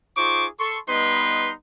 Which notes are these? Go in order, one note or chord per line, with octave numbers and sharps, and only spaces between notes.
D#4 F4 G#4 C5 C#6 D6
A4 C6 C#6
G3 B3 D#4 B4 D#5 C6